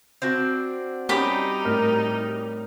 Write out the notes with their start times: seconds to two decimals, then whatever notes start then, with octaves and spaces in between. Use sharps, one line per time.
0.22 C4 D4 F#4
1.09 G3 C#4 D#4 G4 B5
1.65 A2 A#4 F6